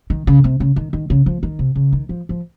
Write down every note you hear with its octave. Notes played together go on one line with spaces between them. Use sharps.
D#3
C#3
C3
C#3
D#3
D#3
C#3
F3
D#3
C3
C#3
D#3
F3
F3